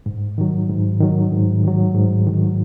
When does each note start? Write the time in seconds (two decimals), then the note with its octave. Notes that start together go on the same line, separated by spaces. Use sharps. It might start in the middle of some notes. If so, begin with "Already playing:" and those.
0.06 G#2
0.38 D#3 F#3
0.70 G#2
1.00 D#3 F#3
1.32 G#2
1.63 D#3 F#3
1.95 G#2
2.27 D#3 F#3